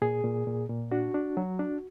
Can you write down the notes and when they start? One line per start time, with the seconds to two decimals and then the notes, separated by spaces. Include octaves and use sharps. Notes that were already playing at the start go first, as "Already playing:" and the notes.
0.02 A#2 G#4
0.24 A#2
0.47 A#2
0.69 A#2
0.91 D4 F#4
1.14 D4
1.37 F#3
1.59 D4